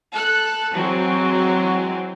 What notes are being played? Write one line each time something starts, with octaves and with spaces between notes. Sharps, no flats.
A4 F#6
E3 F#3 G#3 C4